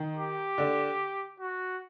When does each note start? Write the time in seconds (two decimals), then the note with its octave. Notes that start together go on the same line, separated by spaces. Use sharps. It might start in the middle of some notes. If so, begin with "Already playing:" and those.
Already playing: D#3
0.17 G4
0.58 D3
1.40 F#4